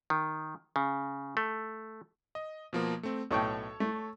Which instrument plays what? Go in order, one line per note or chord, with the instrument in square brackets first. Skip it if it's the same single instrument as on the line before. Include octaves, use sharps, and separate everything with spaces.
[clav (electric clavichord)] D#3
C#3
A3
[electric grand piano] D#5
B2 F3 A#3
A3 C4
[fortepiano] B1 A2 G5 [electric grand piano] A4 C#5 C#6
[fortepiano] A3